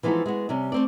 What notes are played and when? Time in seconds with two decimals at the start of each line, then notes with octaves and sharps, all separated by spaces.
0.03 E3 F3 G#3 B3 D#4 A4
0.26 G#3 B3 F#4
0.49 C3 G3 C#4
0.72 A3 C4 D5